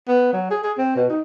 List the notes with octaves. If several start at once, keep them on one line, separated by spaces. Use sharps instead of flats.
B3
F#3
G#4
G#4
C4
B2
D#4